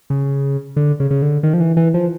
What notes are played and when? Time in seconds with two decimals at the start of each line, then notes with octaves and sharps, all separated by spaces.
0.10 C#3
0.76 D3
1.00 C#3
1.11 C#3
1.22 D3
1.43 D#3
1.54 F3
1.60 E3
1.77 E3
1.94 F3